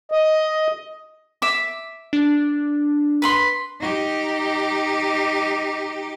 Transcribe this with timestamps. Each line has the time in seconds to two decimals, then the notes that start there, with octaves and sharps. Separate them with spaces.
0.12 D#5
1.42 E5 D6
2.13 D4
3.22 B4 B5 C6
3.81 D#4 G4